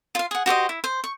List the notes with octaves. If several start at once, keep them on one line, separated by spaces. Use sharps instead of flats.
F4 F5
G#4 F#5
F#4 G4 C5 D#5
E4
C5
C#6